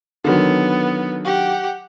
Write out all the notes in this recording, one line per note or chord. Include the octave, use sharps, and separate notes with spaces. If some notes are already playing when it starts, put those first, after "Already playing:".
D3 D#3 F#3 B3
G4 F#5